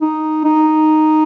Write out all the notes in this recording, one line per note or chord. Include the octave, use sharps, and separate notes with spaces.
D#4
D#4